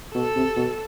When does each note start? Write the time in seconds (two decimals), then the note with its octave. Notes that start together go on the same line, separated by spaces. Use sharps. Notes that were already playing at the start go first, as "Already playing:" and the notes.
0.14 B2 A4
0.36 C3
0.56 B2